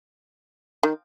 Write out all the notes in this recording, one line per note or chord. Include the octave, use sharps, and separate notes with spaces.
D#3